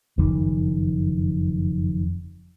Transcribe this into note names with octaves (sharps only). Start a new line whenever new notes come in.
F#1 F2 D#3